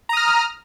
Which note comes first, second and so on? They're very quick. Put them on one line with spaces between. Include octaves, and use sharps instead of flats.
A#5 D#6 F6